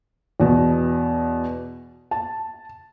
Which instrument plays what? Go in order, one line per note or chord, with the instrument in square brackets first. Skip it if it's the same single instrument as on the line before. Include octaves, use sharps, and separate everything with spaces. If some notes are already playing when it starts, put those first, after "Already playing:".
[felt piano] E2 B2
A5